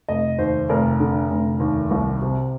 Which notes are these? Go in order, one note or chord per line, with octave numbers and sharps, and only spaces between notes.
F1 D#5
D#2 C5
F1 A#4
D3
F1
D#2
C2
C3